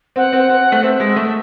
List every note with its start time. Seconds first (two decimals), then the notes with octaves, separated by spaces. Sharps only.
0.16 C4 F#5
0.33 C4
0.49 C4
0.72 A3
0.83 C4 E5
1.00 G#3
1.16 A3